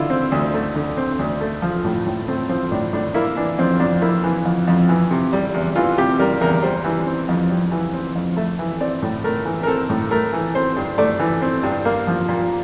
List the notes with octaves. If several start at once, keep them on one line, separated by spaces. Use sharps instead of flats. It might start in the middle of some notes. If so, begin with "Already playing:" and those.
Already playing: D3 E4 F4
C4
D2
A3
D3
C4
D2
A3
F3
A2
A2
A3 C4
F3 C4
A2 D4
A2 D4
A#3 E4
E3 D4
F2 C4
F2 D4
A#3 E4
E3
F2
F2
E3
C3
G3
E2
E3 F4
C3 G4
G3 A#4
E2 A#4
G3 C5
E3
C4
F2
G3
E3
C4
F2
A3 E5
E3
C4 D5
A2
A3 A#4
E3
A#4
C4 A4
A2
A3 A#4
E3
C4 C5
G2
A3 D5
E3
C4
G2
A#3
F3
A#2